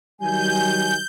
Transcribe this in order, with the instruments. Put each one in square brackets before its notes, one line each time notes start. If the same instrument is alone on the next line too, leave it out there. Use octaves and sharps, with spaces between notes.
[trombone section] D#3 F#3 G3 [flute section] G#5 [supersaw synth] G6